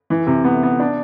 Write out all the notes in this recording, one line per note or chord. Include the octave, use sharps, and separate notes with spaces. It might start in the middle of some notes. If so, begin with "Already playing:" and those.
E3
C3
B3
B3
D4